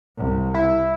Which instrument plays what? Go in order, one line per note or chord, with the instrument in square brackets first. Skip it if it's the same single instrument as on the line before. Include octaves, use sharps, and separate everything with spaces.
[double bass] C2
[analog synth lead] E4